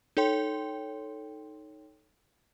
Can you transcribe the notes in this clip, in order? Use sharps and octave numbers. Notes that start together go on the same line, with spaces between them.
D#4 A4 C#5 G5 C6